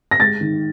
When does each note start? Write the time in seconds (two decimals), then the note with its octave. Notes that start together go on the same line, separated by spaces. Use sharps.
0.11 A#6
0.19 G#3 A6
0.41 D#3